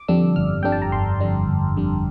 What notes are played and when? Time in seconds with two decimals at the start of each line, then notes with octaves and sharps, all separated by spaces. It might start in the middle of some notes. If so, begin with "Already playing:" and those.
Already playing: D6
0.08 F2 D3 G3 D4 E6
0.36 G1 F6
0.63 F2 D3 G3 D4 G5
0.72 A5
0.82 A#5
0.92 G1 C6
1.20 F2 D3 G3 D4
1.48 G1
1.77 F2 D3 G3 D4